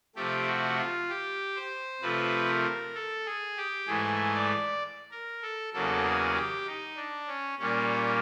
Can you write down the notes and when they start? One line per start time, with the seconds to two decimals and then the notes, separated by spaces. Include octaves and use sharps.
0.16 C3 F3 A3 G4
0.47 F#4
0.78 F4
1.09 G4
1.56 C5
2.01 C3 F3 A3 B4
2.48 A#4
2.94 A4
3.26 G#4
3.57 G4
3.87 G#2 E3 A3 G#4
4.35 D5
5.11 A#4
5.42 A4
5.73 E2 C#3 F#3 A#3 A4
6.05 G#4
6.35 G4
6.67 D#4
6.97 D4
7.28 C#4
7.59 A#2 G3 A#3 C#4